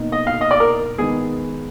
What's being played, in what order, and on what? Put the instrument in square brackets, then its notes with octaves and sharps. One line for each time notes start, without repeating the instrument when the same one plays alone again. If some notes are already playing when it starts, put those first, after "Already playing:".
Already playing: [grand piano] B2 A#3 D#4
[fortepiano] D#5
F5
D#5
D5
A#4
[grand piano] D#3 G#3 B3 [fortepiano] G#4